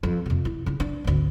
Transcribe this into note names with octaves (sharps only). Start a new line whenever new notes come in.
F2
F2 C3
E4
C#3 E4
D4
G#1 D2